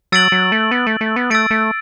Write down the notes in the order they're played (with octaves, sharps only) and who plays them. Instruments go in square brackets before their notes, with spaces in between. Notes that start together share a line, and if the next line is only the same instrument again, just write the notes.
[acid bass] F#3 [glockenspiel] E6 A6 D7 F#7
[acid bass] F#3
A3
B3
A3
A3
B3
[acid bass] A3 [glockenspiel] E6 A6 D7
[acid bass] A3